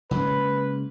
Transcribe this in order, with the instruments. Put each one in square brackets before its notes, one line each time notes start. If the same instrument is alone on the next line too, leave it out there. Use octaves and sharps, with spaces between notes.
[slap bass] C#3 G#3 A#3 [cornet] B4